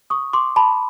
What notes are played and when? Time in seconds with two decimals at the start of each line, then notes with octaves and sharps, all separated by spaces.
0.10 C#6 D#6
0.33 C6 D6
0.56 A5 B5